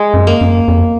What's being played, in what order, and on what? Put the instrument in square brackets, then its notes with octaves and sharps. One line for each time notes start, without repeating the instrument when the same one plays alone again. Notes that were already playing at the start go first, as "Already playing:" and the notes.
Already playing: [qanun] G#3
[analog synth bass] F#2
[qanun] A#3
[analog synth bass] F#2
F2